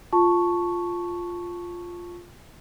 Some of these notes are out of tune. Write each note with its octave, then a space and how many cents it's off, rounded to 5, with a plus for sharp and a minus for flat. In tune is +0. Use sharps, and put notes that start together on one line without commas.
F4 +0 A5 +0 C#6 +0